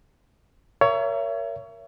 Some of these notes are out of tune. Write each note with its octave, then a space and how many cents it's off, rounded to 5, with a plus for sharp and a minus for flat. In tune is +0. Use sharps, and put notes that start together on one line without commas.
A#4 +0 C#5 +20 E5 +35